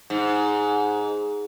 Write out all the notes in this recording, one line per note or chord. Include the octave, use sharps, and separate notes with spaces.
G#2